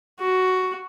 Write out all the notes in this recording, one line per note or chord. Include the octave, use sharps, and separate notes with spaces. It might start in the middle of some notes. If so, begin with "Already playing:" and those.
F#4